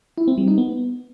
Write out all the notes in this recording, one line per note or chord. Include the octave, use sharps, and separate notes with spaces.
E4
C4
G3
D#4
B3